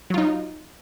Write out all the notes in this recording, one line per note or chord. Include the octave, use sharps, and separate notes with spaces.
F#3 D#4 F4